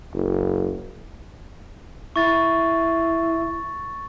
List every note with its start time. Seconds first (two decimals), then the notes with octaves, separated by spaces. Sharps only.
0.14 F#1
2.16 E4 C#6 A6